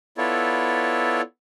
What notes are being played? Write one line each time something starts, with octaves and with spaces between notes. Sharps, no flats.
B3 E4 F4 A4 C#5 D5